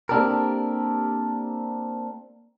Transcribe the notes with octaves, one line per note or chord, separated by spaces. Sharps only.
A#3 C4 D4 G4 A4 A#4